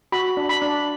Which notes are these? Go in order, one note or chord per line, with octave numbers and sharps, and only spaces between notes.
F#4 B5
D4
B5
D4